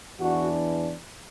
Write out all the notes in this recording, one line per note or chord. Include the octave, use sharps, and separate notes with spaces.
E2 E3 D4 F#4